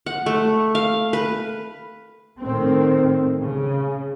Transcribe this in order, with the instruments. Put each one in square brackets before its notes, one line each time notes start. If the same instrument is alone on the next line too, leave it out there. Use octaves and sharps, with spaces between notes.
[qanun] F#5
A3
F5
B4
[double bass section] A2 D#3 C4
C#3